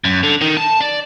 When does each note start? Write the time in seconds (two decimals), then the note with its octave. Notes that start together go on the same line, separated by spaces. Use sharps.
0.04 F#2
0.23 D3
0.42 D#3
0.57 A5
0.81 D5